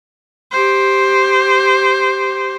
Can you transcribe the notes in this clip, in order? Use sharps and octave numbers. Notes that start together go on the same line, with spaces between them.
G4 C5